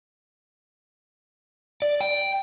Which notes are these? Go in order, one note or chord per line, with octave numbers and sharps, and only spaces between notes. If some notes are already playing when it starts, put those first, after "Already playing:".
D5
G5